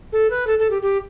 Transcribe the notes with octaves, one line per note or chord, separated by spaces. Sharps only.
A4
B4
A4
A4
G4
G4